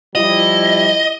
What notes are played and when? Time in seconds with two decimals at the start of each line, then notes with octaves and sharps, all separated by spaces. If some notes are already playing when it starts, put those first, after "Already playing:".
0.15 F3 G3 E4 D#5